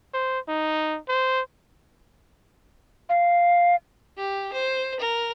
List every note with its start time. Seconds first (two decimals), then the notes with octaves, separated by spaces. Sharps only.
0.14 C5
0.49 D#4
1.09 C5
3.09 F5
4.17 G4
4.53 C5
5.00 A#4